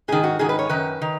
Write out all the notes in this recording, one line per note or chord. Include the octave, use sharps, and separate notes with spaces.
G#2 D#3 G#4
F#4
G#2 D#3 G#4
B4
C#5
F#2 D#3 B4
D#3